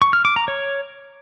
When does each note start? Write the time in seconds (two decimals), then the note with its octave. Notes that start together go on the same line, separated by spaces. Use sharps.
0.02 C#6
0.13 F6
0.25 D6
0.36 A#5
0.48 C#5